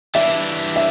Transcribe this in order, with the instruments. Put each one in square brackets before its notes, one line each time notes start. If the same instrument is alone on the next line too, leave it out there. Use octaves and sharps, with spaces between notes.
[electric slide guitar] E3 G3 D4 [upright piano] E5
[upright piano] E5